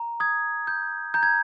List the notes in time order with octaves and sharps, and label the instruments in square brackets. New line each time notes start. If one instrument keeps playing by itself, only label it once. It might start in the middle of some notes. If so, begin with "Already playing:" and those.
Already playing: [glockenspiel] A#5
D#6 G#6
G6
A#5 G6
G#6